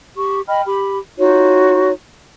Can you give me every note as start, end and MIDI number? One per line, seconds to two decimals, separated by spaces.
0.16 0.40 67
0.16 0.40 85
0.47 0.62 75
0.47 0.62 79
0.47 0.62 83
0.47 0.62 89
0.66 0.98 67
0.66 0.98 83
1.18 1.90 63
1.18 1.90 65
1.18 1.90 66
1.18 1.90 73